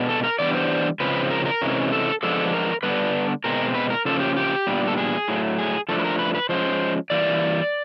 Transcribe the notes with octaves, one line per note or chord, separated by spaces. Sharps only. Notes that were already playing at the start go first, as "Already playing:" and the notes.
Already playing: B2 G#3 B3 D4
A4
A#4
E3 G3 B3 D4 D5
C5
C#3 F3 G#3 C4 B4
A#4
A#4
C3 E3 G#3 C#4
A4
F3 G#3 B3 D4 A4
A#4
D3 G3 B3 D4 B4
B2 G#3 C4 A#4
B4
A#4
C#3 F3 A#3 C#4 A4
G4
G4
A#2 G3 B3 D4
A4
G#4
A2 F#3 A3
G#4
F3 A3 D4 A4
B4
A#4
B4
B4
F3 G#3 C#4 C5
E3 G3 A#3 D5